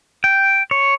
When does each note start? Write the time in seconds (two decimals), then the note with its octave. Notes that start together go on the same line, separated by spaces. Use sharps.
0.24 G5
0.71 C#5